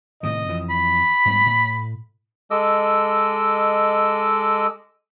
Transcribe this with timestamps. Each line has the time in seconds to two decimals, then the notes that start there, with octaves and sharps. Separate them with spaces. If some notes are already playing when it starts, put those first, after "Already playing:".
0.23 A2 C3 D#3 D#5
0.48 F2 E3
0.70 B5
1.25 G#2 G3 B3
1.46 A2
2.51 G#3 A4 D#5 D6 E6